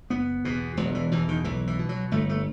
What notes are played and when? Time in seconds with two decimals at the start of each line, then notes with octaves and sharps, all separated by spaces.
0.10 F#1 B3
0.44 E2 B2
0.77 E1 F#3
0.95 E3
1.11 E2 B2 E3
1.28 D#3
1.44 B1 E3
1.67 E3
1.79 B2
1.89 F#3
2.11 G1 A3
2.29 A3